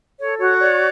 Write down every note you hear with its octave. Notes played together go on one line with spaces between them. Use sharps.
A4 C#5
F#4 C#5
C#5 D5